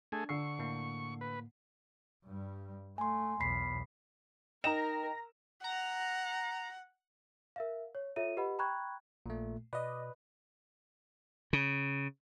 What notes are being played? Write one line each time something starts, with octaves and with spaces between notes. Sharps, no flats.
A3 D4 G#4
D3 C#6 E6 C7
A2 A#3
B4
G2 G3
A3 G#5 C6
B1 E2 B5 B6 C7
D#4 A#4 D#5 G5 A#5 A#6 E7
F#5 A#5
A#4 E5 F5
C#5
F4 A4 C#5 E5 D#7
G4 B4 D#5 F#5 B5
G5 A#5 B5 C#6 F#6 G#6
A#1 A#2 A3
B2 B4 D5 D#5
C#3